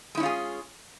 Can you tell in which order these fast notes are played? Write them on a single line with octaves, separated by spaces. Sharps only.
G#3 E4 C#4 F4 G#4